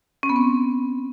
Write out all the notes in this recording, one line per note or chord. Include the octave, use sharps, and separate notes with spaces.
C#4
B3
C4